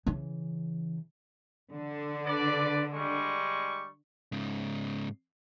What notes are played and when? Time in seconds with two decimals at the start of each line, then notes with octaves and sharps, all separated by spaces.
0.06 C#3 E3
1.72 D3
2.27 B4 D5
2.94 G3 G#3 C#6
4.32 G#2 C#3